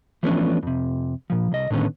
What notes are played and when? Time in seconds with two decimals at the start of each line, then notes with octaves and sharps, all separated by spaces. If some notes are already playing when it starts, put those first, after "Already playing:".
0.23 E3 F3 A3 B3 C#4 D4
0.63 F2 C3
1.30 A#2 F3
1.52 C2 D#5
1.70 A2 D3 D#3 B3 C#4